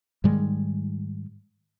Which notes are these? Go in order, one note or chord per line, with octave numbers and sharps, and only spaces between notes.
G#2 D#3 G3 G#3